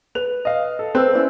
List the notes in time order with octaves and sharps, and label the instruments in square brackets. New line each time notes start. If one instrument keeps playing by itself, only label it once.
[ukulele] B4 [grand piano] F7
[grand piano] D#5 F5
A4
[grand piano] C4 E6 [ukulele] B4
[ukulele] C#4 E4 D5